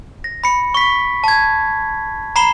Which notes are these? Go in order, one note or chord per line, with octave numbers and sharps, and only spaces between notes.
A#6
B5 C#7
C#6 B6
A5 G#6
A#5 B5 C7 E7 G7